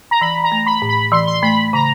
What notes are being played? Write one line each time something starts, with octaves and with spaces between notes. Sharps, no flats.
A#5
E3 B5
A#5
A3
B5
A2
B5
E3 C6
C6
A3 B5
C#3 A#5